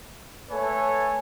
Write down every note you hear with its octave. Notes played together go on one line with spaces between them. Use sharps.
A3 A4 B4 C#5 G#5